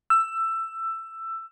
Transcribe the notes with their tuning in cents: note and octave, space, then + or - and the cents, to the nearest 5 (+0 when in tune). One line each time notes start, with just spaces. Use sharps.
E6 +15